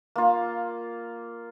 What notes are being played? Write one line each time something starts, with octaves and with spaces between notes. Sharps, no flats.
A#3 F4